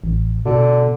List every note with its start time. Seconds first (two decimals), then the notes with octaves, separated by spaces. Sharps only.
0.04 A1
0.46 B2 D3